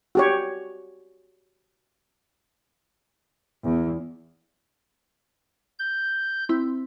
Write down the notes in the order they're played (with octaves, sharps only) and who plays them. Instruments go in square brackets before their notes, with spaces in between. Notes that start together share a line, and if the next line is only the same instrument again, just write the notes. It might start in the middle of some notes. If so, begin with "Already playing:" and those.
[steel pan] F#4 G4 C#5
[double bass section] E2
[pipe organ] G6
[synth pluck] C4 E4